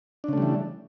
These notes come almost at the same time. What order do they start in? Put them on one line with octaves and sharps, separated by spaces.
D4 C#3 A3 G3 E3